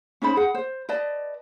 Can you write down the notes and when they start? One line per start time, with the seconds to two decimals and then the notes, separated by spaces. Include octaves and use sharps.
0.22 C#4 D#4 C5 B5
0.36 G#4 F#5
0.54 C5
0.89 B4 D5 D#5 A5